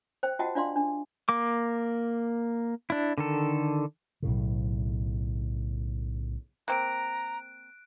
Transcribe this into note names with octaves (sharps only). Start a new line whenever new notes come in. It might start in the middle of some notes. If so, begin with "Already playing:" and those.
C5 G5
F4 F#4 D#5 F#5 G5 A5
D4 F4 D5 F5 C6
D4
A#3 D6
D4 E4
D3 D#3 A4
B1 A2 C#3
A#3 C4 A#5 F#6 D7